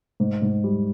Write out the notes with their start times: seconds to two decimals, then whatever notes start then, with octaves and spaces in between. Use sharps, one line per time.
0.20 G#2
0.42 G#2
0.64 G3